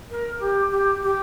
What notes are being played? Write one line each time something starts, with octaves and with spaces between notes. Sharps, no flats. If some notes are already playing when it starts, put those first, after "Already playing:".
A#4
G4
G4
G4